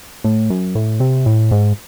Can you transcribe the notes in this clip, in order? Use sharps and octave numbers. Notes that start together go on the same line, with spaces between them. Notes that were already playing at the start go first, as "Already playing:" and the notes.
A2
F#2
A2
C3
A2
G#2